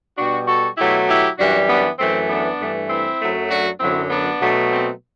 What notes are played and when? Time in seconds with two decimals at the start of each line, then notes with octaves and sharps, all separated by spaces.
0.18 B2 G3 D4 F#4
0.48 F#4 A4
0.78 B2 F#3 A3 E4 G4
1.08 E4 G4
1.39 F#2 E3 G3 D4 F#4
1.69 B3 D4
1.99 F#2 E3 A3 C4
2.30 B3 D4
2.59 G2 E3 A3
2.90 C4 E4
3.20 F#2 F#3 A3
3.50 D4 F#4
3.80 F#2 D3 F#3 C4 E4
4.10 B3 D4
4.41 B2 F#3 A3
4.72 C4